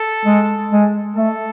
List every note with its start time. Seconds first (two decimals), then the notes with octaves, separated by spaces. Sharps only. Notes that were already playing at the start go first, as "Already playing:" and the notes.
Already playing: A4
0.25 G#3
0.71 G#3
1.16 A3 A4